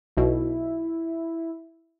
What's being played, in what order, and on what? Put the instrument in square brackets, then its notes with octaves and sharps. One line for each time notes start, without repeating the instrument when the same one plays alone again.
[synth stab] B1 B2 [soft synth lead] E4